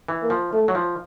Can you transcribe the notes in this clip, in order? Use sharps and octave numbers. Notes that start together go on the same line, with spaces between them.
E3
A#3
F3
A3
F#3
F3